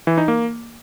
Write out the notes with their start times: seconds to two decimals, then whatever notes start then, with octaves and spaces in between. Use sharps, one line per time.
0.07 E3
0.18 D#4
0.28 A#3